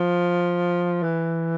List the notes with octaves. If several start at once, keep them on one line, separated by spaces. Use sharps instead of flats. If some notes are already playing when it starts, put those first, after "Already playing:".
Already playing: F3
E3